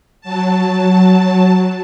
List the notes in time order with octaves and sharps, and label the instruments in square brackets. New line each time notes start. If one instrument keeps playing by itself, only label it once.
[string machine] F#3 A5